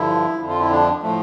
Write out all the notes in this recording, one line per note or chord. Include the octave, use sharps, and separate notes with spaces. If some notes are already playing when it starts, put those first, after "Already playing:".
Already playing: G2 D3 F3 E4
F2 D3 F3
F4
E4
D4
A2 F3 A3